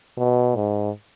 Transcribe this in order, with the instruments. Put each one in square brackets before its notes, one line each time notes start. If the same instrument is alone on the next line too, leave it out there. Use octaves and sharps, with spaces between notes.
[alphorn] B2
G#2